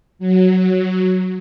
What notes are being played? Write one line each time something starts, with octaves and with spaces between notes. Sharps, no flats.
F#3